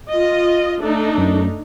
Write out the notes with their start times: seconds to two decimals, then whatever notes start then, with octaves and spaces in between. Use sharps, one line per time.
0.10 F4 D#5
0.81 A3 D4 D#4
1.18 F#2